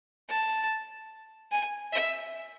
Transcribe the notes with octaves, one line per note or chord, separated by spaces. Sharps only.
A5
G#5
E5